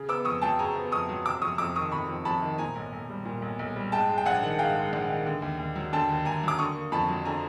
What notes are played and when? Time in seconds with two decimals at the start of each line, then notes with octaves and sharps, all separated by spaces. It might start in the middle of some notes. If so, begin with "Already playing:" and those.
Already playing: C#3
0.09 B3 D6 E6
0.25 F2 C#6 D#6
0.42 F#3 G5 A5
0.58 C#3 G#5 A#5
0.76 B3
0.92 F2 C#6 D#6
1.09 F#3
1.25 C3 D6 E6
1.42 F2 C#6 D#6
1.58 F2 D6 E6
1.76 D#3 C#6 D#6
1.92 C3 B5 C#6
2.09 F2
2.25 F2 A5 B5
2.42 D#3
2.58 A#2 G#5 A#5
2.76 B1
2.93 B1
3.10 G3
3.25 A#2
3.42 B1
3.59 B1
3.76 G3
3.92 G#2 G5 A5
4.09 G#3
4.18 G5
4.25 A#1 F#5 G#5
4.42 D#3
4.59 G#2 F5 G5
4.75 G#3
4.93 A#1
5.08 D#3
5.26 D3
5.42 D#2
5.59 D#2
5.76 F#3
5.93 D3 G5 A5
6.09 D#2
6.25 D#2 G#5 A#5
6.43 F#3 D6
6.59 D3 C#6 D#6
6.75 A#3
6.92 F2 A5 B5
7.09 F#3
7.25 D3 G#5 A#5